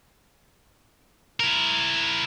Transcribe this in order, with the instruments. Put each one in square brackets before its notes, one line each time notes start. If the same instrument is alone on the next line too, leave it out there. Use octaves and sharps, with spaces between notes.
[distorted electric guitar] E4 A#4